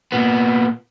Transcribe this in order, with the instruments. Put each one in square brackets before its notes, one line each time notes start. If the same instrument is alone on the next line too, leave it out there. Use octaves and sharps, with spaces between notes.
[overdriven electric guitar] A#2 B3